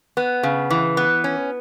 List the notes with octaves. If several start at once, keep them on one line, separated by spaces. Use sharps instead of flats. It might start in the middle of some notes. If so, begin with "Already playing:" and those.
B3
C#3
E3
B3
C#4